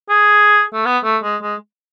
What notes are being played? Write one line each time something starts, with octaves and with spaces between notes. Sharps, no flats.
G#4
A3
B3
A3
G#3
G#3